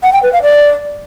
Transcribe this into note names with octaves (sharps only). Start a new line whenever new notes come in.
F#5
G5
B4
F5
D5